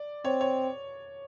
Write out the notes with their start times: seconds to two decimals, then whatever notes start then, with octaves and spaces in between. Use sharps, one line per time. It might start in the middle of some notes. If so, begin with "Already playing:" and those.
Already playing: D5
0.25 C4 C#5
0.41 C#5